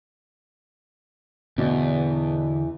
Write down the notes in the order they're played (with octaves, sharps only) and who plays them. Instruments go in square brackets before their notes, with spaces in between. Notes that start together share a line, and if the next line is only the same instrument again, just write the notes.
[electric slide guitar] E2 [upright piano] B2 [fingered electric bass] D3